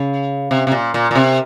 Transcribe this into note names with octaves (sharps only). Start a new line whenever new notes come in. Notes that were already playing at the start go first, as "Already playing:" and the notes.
Already playing: C#3
C3
C3
A#2
A#2
A#2
C3